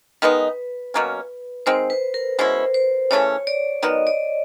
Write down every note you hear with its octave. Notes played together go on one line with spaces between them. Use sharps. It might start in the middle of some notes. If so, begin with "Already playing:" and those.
D#3 G#3 B3 D#4 B4
B2 F#3 A#3 C#4
D#3 G#3 C4 C5
B4
A#4
B2 G#3 C#4 E4 C5
C5
C#3 E3 A3 C#4 C#5
D5
D#3 F#3 B3 D#5
D5